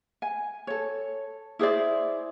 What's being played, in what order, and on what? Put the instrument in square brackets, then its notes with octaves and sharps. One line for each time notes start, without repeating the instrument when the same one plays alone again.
[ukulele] G#5
A4 C#5
E4 G#4 C5 D5